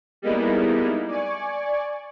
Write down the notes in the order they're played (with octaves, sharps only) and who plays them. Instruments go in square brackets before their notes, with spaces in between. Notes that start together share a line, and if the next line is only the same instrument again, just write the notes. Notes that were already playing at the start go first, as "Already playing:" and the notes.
[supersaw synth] G3 G#3 A#3 B3 D#4 E4
D5 G#5 C#6